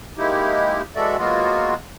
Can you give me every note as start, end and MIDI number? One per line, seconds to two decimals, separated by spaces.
0.18 0.82 56
0.18 0.82 58
0.18 0.82 63
0.18 0.82 64
0.18 0.82 67
0.96 1.17 52
0.96 1.17 56
0.96 1.17 66
0.96 1.17 69
0.96 1.17 74
0.96 1.17 76
1.18 1.74 54
1.18 1.74 56
1.18 1.74 58
1.18 1.74 59
1.18 1.74 65
1.18 1.74 66